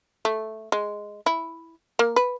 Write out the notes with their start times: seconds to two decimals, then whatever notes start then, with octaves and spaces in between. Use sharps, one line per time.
0.25 A3
0.72 G#3
1.26 E4
1.99 A#3
2.16 B4